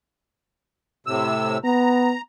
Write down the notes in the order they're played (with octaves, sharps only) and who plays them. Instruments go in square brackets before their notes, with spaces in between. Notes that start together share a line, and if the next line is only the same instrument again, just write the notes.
[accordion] A2 C3 E6
[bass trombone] B3 [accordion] A#5